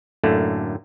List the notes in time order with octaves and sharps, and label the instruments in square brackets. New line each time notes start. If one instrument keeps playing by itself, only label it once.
[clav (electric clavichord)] F#2 A2 D3 A3 A#3